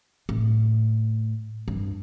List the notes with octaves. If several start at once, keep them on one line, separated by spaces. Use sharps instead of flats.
A2
G2